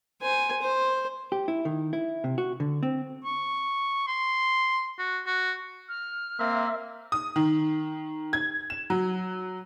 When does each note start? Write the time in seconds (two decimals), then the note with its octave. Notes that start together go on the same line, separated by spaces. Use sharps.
0.22 C5 G#5
0.62 C5
1.32 G4
1.48 E4
1.65 D#3
1.93 E4
2.24 C3
2.38 F#4
2.60 D3
2.83 C4
3.24 C#6
4.07 C6
4.99 F#4
5.26 F#4
5.89 F6
6.39 A#3 C4 E5
7.12 D#6
7.36 D#3
8.33 G#6
8.70 E7
8.90 F#3